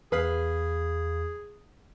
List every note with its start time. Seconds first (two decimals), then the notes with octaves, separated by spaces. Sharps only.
0.12 E2 G#4 B4 F5 B5